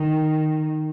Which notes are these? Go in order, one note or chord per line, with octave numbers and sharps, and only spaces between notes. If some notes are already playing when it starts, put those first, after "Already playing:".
Already playing: D#3